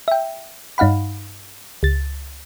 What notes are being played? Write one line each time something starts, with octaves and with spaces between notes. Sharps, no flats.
E5 G5
G2 D#4 F5 F#5 B5
C#2 A6